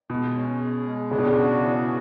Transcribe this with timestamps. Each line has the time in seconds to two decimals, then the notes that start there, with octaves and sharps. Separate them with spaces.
0.10 B2 G#3
0.35 C#4
0.60 G#4
0.85 G#3
1.11 C#3 D4
1.18 B2
1.27 C#3
1.37 F#4
1.61 E3